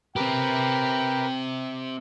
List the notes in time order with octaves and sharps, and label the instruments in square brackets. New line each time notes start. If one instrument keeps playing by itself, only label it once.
[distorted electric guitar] C4 G4 [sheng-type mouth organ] A#4 B4 [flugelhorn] G5